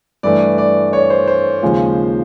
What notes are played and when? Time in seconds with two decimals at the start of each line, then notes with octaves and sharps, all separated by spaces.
0.23 G2 E3 A3 D5
0.58 D5
0.93 C#5
1.10 C5
1.27 C5
1.63 D#2 C#3 F3 G#3